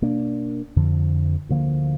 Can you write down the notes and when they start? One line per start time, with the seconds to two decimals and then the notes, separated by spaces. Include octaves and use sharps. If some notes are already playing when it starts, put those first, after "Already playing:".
0.02 B2 A#3 D4
0.76 F2 D3 F3
1.49 D2 D3 F3 A#3